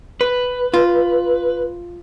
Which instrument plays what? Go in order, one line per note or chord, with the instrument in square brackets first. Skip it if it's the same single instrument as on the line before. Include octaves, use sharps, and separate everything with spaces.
[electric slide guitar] B4
[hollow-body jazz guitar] F4